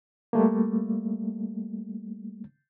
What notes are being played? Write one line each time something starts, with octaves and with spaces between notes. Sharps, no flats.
G3 A3 A#3